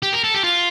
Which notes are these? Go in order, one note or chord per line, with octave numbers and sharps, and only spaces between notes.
G4
A#4
A4
G4
F4